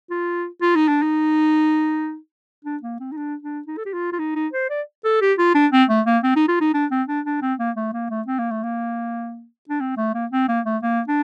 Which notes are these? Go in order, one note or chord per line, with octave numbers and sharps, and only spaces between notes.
F4
F4
D#4
D4
D#4
D4
A#3
C4
D#4
D4
D4
D#4
A4
G4
F4
F4
D#4
D#4
C5
D5
A4
G4
F4
D4
C4
A3
A#3
C4
D#4
F4
D#4
D4
C4
D4
D4
C4
A#3
A3
A#3
A3
C4
A#3
A3
A#3
D4
C4
A3
A#3
C4
A#3
A3
A#3
D4